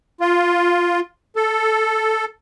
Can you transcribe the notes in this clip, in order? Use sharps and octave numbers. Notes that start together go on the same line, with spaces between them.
F4
A4